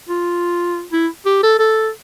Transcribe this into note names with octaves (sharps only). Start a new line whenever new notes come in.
F4
E4
G4
A4
A4